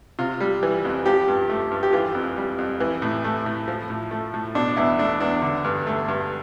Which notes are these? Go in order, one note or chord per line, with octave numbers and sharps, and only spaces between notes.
C3 F4
G3
E3
F2
F3 G4
G2
A3
G2
G4
E3 F4
F2
G3
F2
E3
A2
A3
A2
F3
A2
A3
A2
B2 D4
E2 E4
A3 D4
E2 D4
D3
G2
A3
G2